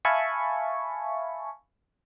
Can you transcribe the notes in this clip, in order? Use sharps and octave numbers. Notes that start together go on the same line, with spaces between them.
E5 F5 G#5 A5 B5 C#6